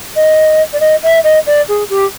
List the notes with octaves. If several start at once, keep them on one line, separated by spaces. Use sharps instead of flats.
D#5
D5
D#5
E5
D#5
D5
G#4
G4